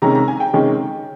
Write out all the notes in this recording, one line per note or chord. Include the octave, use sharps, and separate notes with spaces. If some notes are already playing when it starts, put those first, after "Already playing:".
C3 D#3 G#3 C#4 A#5
A#5
G#5
G5
C3 D#3 G#3 C#4